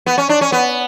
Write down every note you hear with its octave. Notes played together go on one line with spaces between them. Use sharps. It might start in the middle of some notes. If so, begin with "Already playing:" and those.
B3
C#4
D4
C#4
B3